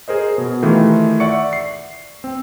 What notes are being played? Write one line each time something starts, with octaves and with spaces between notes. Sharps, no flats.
G#4 A#4 C5 D#5
B2
D#3 E3 A3 F4 G4
D5 E5 F#5 C#6 C#7
C7
C4